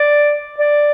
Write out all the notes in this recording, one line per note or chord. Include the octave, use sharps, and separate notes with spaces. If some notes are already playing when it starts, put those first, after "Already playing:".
Already playing: D5
D5